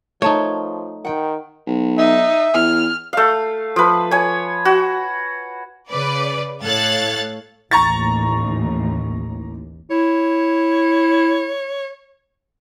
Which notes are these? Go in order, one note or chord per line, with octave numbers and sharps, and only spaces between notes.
F3 A3 D#4 A#4 C#5 A5
D#3 F#5 G5
B1
D#4 E5
E2 F6
A3 F5
F3 B4
C#5 G#5
F#4
C#3 B4 D5
A2 A4 C#5 F5 F#6 A6
A1 D#2 A#5 C#6 A6
E4 C#5